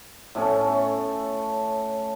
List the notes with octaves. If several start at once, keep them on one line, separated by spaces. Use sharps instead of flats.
A2 A3 C#4 A4